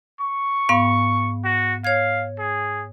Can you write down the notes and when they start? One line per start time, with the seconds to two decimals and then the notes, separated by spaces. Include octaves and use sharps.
0.21 C#6
0.69 G#2 B3 F5
1.45 F#4
1.85 C#5 F5 G#6
2.39 G#4